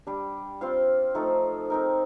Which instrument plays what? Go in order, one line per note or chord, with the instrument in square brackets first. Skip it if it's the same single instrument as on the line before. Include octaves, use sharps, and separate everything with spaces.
[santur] G3 D4 G4
C4 F4 C5 F5
F3 A3 D#4 A4
C4 D#4 A#4